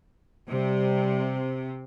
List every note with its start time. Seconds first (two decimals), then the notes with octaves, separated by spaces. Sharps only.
0.51 C3 G3